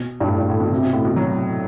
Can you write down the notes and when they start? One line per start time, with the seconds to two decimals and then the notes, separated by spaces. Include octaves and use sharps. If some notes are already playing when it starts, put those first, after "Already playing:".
Already playing: B2
0.20 G2
0.27 A2
0.38 G2
0.48 A2
0.60 B2
0.71 C3
0.83 B2
0.93 A2
1.05 B2
1.16 F#3